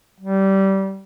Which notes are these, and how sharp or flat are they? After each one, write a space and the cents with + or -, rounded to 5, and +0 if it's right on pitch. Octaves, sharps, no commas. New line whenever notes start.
G3 -20